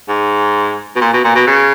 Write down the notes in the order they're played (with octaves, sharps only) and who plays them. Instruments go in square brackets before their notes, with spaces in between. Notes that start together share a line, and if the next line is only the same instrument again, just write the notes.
[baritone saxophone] G#2
B2
A#2
B2
A#2
B2
C#3